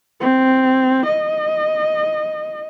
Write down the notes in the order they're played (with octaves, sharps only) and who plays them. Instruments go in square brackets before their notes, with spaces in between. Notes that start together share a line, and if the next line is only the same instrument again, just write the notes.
[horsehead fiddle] C4
D#5